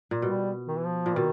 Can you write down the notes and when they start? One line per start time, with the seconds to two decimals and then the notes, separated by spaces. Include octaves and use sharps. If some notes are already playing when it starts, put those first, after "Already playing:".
0.11 A#2
0.22 B2 G3
0.68 D#3
0.77 E3
0.85 F3
1.06 A#2
1.16 B2 D#3